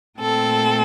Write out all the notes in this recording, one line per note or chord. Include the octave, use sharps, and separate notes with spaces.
A#2 A3 C4 A4